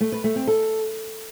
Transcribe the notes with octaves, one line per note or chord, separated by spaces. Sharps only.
A3
B4
A3
C4
A4